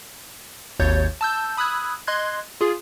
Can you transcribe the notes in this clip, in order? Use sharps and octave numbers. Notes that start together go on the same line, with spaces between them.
G#1 D#2 C#5 G6 A6
A5 E6 G6
B5 D#6 E6 F#6 G#6
D#5 C6 F#6 G#6
F4 G#4